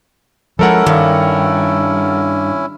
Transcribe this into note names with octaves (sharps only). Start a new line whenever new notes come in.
F3 G#3 C#4 E4 A4 A#4 F#5
G2 D#3